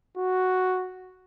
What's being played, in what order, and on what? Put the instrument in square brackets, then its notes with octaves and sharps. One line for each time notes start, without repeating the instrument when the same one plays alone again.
[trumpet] F#4